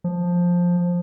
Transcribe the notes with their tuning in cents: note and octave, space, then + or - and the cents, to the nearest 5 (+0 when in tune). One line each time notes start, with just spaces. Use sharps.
F3 +10